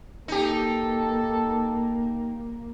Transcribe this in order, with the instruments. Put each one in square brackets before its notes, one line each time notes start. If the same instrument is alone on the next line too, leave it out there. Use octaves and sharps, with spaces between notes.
[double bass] A#3 [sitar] D#4 G4 [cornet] A4